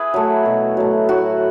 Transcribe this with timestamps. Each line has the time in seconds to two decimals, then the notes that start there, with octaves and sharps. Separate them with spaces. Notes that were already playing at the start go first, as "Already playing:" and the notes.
Already playing: E4 G#4 B4
0.14 F#3 A3
0.45 B2
0.77 F#3 A3
1.09 A2 F#4